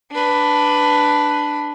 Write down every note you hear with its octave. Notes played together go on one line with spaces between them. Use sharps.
D4 B4